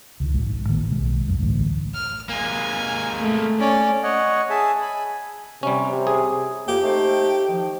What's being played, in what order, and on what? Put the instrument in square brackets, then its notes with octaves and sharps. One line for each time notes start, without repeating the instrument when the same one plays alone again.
[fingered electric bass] C#2 D#3
A#1 G#2
A1 D#3 G3 A#3
B1 G#3
B1 F#2
A1 D2
[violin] F6
[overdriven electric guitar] G#3 A#3 [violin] G#5
[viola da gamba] A3
[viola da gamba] C#4 [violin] D5
[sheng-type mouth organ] C#5 D#5 F#5
G#4 E5 G#5 A5
G#5 B5
[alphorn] C3 [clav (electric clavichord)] G3 C#4
[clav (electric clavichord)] G#4
[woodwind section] F2 A#3 [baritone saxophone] G4
[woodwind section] A3 D#4 C5
D#3 F3